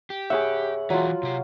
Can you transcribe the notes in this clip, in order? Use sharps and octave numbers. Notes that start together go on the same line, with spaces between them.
G4
G#4 C#5 E5 F#5 B5
E3 F#3 F4 F#4
C3 G4